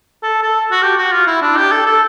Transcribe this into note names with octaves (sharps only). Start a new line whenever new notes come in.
A4
A4
F#4
G4
F#4
F4
E4
D4
G4
A4
A4